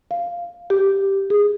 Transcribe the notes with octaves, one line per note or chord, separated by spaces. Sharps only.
F5
G4
G#4